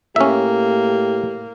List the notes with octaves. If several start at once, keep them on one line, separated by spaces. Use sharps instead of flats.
A2 A#3 C#4 G4 E5